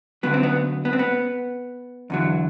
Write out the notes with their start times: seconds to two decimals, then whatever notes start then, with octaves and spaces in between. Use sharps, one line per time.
0.23 D2 D3 F#3 B3
0.34 C4
0.43 B3
0.85 B3
0.93 C4
0.99 B3
2.10 E2 D3 F#3